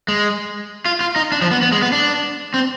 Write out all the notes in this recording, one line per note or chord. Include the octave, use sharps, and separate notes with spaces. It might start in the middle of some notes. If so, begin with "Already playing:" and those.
G#3
F4
F4
D#4
D4
F3
B3
B3
G#3
B3
D4
C4